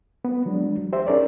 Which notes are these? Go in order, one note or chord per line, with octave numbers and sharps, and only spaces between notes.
B3
E3 F#3 G#3 D4
G4 C5 E5
C#4 D#4 G#4 A#4 C#5 D5